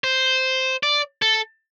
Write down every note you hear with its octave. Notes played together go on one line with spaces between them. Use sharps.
C5
D5
A4